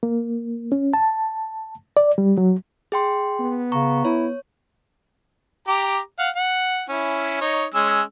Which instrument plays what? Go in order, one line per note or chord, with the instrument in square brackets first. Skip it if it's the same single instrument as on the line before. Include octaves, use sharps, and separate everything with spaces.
[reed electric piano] A#3
C#4
A5
D5
G3
F#3
[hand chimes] G#4 G5 C6
[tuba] B3
[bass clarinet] C#3 [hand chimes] A#5 C#6
[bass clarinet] E4 [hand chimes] C#5
[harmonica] G4 A#5 D6
F5 F#5
F#5
C#4 E4
D#4 C#5
G#3 C#4 E6